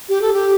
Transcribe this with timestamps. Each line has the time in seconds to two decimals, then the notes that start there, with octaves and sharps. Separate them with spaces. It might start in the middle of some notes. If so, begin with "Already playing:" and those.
0.09 G4
0.22 A4
0.33 G4